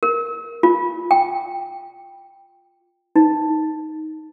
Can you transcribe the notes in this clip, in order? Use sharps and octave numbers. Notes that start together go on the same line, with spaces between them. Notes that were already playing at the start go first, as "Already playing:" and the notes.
A#4
F4
G5
D#4